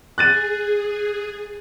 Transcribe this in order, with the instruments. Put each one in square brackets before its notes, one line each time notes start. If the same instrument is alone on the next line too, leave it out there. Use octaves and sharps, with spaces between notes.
[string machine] G#4 [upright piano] F#6 A6 D#7